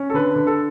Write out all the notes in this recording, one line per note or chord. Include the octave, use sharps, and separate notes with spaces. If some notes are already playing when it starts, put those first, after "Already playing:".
Already playing: C#4
A4
D3 B4
D3
A4